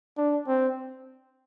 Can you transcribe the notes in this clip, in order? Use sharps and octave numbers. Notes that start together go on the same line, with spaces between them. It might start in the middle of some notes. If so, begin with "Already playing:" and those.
D4
C4